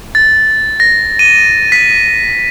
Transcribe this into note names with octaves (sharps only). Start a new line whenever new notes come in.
A6
A#6
D#7
B6